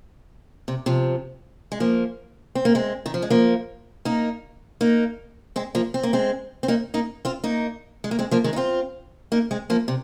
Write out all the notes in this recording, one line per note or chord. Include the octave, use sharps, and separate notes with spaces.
C3
C3 F3
G#3
F3 A#3
C4
A#3
G#3 C4
D#3
F3
G#3
F3 A#3
A#3 D#4
A#3 D#4
G#3 C4
F3 A#3
C4
A#3
G#3 C4
C4
A#3 D#4
A#3 D#4
C4 F4
A#3 D#4
G#3
A#3
G#3 C4
F3 A#3
D#3 G#3
D#4
C4 F4
A#3 D#4
G#3 C4
F3 A#3
C3